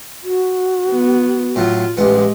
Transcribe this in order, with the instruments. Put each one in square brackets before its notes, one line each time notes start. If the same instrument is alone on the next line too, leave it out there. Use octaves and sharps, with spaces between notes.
[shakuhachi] F#4
[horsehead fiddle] B3
[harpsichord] A2 F#3 [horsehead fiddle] F4
[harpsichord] A1 B3 [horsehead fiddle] G#3 G4